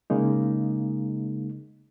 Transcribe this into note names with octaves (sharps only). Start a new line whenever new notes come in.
C#3 G#3 A#3 D#4